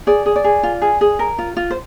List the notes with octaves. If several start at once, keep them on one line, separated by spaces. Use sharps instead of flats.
G#4 D5
G#4
D5
G#4
F4
G#4
G#4
A#4
F4
F4
C5